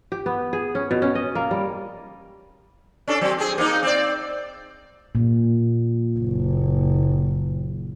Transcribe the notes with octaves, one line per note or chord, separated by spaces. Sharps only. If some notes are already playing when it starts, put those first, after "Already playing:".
G4
B3
G#4
C#4
B2
C#4
D#5
A#3
G3
C#4 D4 A4
F#3 C4
C4 G#4
A#3 C4 D#4
C4 D5
A#2
F#1